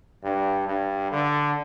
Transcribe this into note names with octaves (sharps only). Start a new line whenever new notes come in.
G2
G2
D3